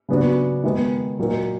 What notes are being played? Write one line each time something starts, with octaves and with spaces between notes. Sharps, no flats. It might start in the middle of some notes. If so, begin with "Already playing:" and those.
C#3 F#3 B3 D4 F#4
D#3 G#3 B3
A#2 F#3 A#3 D#4